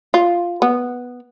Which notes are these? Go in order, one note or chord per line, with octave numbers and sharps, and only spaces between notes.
F4
B3